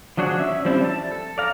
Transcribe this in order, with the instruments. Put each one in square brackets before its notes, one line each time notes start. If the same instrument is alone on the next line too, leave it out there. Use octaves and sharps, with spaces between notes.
[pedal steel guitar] F3 F#3 D4 F#4 G#4
C#4 E5 E6
F3 G3 C4 D4 E4
A5
A4
D5 F5 A#5